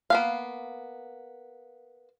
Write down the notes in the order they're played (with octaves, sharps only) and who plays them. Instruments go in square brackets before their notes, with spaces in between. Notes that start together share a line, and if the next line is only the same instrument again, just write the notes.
[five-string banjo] A#3 B3 F5